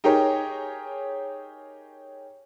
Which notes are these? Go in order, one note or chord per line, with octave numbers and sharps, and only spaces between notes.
D#4 G4 G#4 A#4 C#5